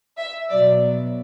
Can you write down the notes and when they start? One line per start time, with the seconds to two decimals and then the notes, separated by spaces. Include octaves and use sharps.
0.19 E5
0.49 B2 F#3 D5